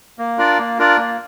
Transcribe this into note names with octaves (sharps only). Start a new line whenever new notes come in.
A#3
D4 F4 A#4 D5
A#3
D4 F4 A#4 D5
A#3